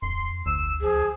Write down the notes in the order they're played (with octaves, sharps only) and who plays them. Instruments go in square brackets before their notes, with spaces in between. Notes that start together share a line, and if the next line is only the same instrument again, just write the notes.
[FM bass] D1 [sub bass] F2 [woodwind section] C6
[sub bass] F#1 [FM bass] D2 [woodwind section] E6
[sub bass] C#2 [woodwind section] F3 [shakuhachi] G#4